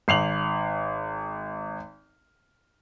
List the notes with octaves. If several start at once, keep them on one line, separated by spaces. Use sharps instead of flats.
G#1 C7 F7 F#7